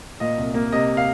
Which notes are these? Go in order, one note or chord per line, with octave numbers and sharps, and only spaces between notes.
A#2 D#5
C2
A#3
C3 D#5
F5